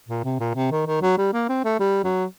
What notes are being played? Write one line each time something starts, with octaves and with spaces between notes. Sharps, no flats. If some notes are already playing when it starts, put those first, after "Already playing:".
A#2
C3
A#2
C3
D#3
D#3
F#3
G3
A#3
C4
A3
G3
F#3